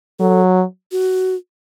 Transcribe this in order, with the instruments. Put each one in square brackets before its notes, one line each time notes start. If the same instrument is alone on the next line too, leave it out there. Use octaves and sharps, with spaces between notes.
[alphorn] F#3 [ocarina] A4
[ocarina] F#4